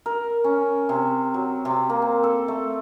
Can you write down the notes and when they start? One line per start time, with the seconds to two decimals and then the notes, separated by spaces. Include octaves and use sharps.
0.06 A#4
0.44 C#4
0.89 C3
1.34 F#3
1.65 C3
1.90 A#3
2.02 C4
2.24 A4
2.48 A3